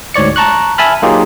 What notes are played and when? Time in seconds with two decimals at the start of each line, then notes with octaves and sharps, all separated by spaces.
0.14 D2 G#2 C#5 D5 C#7
0.36 A5 A#5 C#6 F#6
0.78 E5 G#5 A5 B5 F6
1.02 F#3 A#3 D#4 F4 G4 G#4